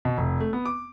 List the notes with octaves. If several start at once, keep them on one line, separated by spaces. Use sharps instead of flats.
B2
F1
A3
B3
D6